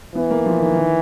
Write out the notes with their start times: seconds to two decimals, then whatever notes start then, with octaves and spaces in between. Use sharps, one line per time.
0.15 E3 B3
0.31 A#3
0.46 F3
0.60 D#3
0.75 D#3